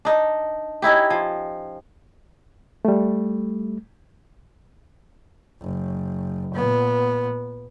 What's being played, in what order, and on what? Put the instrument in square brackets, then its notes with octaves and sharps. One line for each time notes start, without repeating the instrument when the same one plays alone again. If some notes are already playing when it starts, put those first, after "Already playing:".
[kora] D4 D#4
C#4 D#4 E4 G4
F3
[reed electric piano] G3 A3
[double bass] F#1
A#2 B3